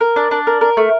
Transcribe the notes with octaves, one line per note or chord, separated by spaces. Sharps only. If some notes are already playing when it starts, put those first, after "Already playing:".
A#4
D4
D4
A#4
A#4
A3